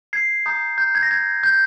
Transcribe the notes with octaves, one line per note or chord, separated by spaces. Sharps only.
G#6 C7
A#5 D#6 G6
G6
G#6
A#6
G#6
G6